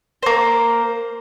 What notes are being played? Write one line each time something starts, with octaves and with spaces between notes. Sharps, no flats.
A#3 C5